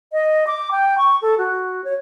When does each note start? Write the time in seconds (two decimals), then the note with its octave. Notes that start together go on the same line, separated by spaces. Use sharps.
0.12 D#5
0.47 D6
0.71 G5
0.98 C#6
1.22 A4
1.38 F#4
1.84 C#5